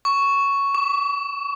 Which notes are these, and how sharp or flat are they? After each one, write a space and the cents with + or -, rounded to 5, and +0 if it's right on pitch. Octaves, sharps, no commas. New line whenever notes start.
C#6 +5
C#6 +45